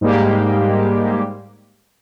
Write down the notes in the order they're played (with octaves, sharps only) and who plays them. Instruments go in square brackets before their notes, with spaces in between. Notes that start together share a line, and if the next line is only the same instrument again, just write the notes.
[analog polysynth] G#2 G3 G#3 A#3 G4